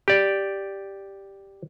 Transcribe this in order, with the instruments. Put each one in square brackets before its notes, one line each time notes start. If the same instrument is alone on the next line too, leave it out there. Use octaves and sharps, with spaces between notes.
[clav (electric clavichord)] G4 D5